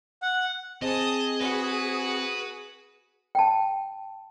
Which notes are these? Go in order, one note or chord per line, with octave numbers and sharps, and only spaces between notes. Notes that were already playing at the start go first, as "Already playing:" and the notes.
F#5
C4 G#4 D#5 A5 D#6
F#4 B4
G5 A5